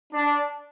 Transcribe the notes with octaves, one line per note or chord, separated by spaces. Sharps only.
D4